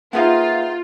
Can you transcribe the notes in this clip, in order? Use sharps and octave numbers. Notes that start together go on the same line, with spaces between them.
A#3 D#4 F4 G#4 B4 E5 F#5